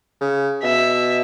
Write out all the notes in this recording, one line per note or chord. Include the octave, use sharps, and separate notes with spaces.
C#3
B2 E5